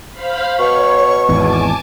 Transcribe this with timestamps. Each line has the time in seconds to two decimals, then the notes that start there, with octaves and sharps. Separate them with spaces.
0.12 C5 F5 B5
0.59 B2 C#5 C#6
1.29 G#1 E2 G#5 A5 D6